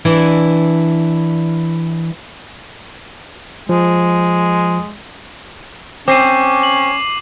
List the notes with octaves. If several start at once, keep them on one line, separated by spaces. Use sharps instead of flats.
E3 D4 E4
F3 G#3
C4 C#4 D6 C7 D#7
F#7